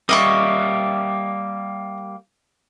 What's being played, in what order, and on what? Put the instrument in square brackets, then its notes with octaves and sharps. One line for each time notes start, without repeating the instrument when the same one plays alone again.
[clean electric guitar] G3 A#3 [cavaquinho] D#5 E5 C#6